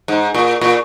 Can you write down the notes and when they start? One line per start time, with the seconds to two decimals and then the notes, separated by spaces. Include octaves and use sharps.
0.08 G#2
0.34 A#2
0.61 A#2